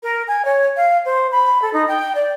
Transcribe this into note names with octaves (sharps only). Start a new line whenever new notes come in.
A#4
G#5
C#5
F5
C5
B5
A4
D#4
G5
D5